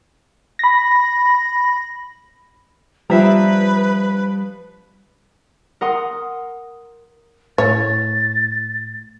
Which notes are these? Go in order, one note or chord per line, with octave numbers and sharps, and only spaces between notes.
B5 A#6
F3 G3 D4 B4 E5 A#5
A#4 F#5 C6 D#6
A2 C#5 A6